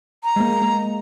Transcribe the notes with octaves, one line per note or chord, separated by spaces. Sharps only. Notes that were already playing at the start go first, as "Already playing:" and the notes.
A#5
G#3 A#3
A#3